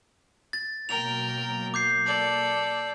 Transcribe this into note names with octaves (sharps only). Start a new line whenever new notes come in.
A6
B2 F#3 A#3 A#4 G5 F7
D6 G6 C7
A4 D5